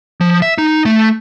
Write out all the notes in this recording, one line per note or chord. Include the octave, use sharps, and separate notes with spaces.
F3
E5
D#4
A3